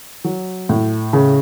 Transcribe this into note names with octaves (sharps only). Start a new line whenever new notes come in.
F#3
A2
C#3